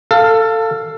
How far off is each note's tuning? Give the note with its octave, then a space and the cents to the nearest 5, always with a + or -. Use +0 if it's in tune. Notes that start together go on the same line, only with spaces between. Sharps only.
A4 +20 F5 +0